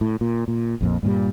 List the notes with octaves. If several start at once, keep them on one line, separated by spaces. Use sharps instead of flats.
A2
A#2
A#2
A#1 F2 A#2
G2 A#2 D3 G3